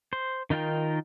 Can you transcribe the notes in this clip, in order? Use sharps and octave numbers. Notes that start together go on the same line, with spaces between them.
C5
D#3 D#4 F4 A#4 G5